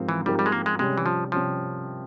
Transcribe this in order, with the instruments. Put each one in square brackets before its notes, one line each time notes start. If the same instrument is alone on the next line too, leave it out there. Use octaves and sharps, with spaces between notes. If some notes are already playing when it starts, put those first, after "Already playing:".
Already playing: [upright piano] G#2 F3 C4 G4 A#4
[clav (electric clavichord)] E3
[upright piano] G#2 F3 C4 G4 A#4 [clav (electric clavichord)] G3
[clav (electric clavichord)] G3
G#3
A#3
G#3
[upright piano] C3 G3 C#4 [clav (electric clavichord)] G#3
[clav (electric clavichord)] E3
F3
[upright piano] C3 G3 C#4 [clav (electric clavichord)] F3